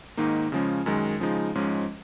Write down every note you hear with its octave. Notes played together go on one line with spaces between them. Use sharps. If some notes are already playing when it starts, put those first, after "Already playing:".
G#2 D#3 A#3 D#4
C#3 F3 G#3 C#4
F#2 D#3 G#3
C#3 F3 G#3 D#4
G#2 F3 G#3 C#4